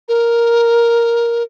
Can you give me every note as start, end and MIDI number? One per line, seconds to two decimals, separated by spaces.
0.09 1.43 70